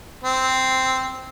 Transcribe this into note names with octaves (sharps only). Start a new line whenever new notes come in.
C4